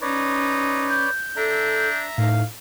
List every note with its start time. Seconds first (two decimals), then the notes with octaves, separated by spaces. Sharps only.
0.02 C#4 D#4 B4 C#5 D5
0.90 G6
1.37 D4 A4 E5 A#5
2.18 A2 D#4 F5